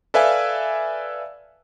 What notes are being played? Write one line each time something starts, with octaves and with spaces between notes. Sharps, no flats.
A4 B4 D5 E5 F5 G#5